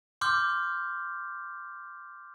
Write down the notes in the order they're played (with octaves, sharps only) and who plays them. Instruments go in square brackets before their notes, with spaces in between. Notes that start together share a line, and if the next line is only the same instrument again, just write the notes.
[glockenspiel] C6 D6 F6 G6